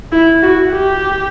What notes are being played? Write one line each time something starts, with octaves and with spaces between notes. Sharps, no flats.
E4
F#4
G4